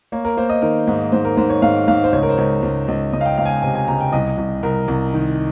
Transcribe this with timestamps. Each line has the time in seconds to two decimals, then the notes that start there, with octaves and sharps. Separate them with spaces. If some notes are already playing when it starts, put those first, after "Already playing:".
0.12 A#3 C#5
0.25 A#4
0.37 A#3 C5
0.49 D#5
0.62 D#3 A#4
0.87 G#2
1.12 G#2 C5
1.25 A#4
1.37 G#2 C5
1.50 C#5
1.62 G#2 F5
1.88 G#2 F5
2.04 C5
2.12 C#2 C#5
2.23 A#4
2.30 C5
2.38 C#2 C#5
2.62 C#2
2.88 C#2
3.13 C#2 D#5
3.21 F5
3.26 G5
3.38 C#2 F5
3.46 G#5
3.50 G5
3.62 C3 G#5
3.75 G#5
3.88 C#2 A#5
4.01 G5
4.12 C2 D#5
4.37 C2
4.63 C2 A#4
4.88 C2
5.14 D#3